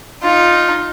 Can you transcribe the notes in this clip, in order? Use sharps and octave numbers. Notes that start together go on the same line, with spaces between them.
D#4 F4